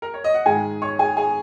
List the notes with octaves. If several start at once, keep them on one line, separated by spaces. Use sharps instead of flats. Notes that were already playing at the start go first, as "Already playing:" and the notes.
A#4
C#5
D#5
F#5
G#2 D#3 G#3 G#4 G#5
C#5 C#6
G#4 G#5
G#4 G#5